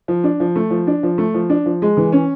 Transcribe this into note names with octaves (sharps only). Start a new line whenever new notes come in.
F3
D4
F3
A3
F3
D4
F3
A3
F3
D4
F3
G#3
E3
C#4